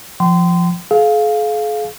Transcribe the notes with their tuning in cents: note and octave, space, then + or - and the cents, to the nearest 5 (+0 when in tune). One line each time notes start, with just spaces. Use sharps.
F3 +0 G5 -30 C6 -25
G#4 +45 F5 +0